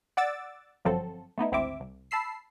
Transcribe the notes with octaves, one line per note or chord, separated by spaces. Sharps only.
D5 F#5 D6 E6 A6
G1 F#2 F3 F#3 C4 A4
A3 B3 D#4 E4
G#1 D2 C4 E4 E5 D6
C2
A5 B5 E6 C7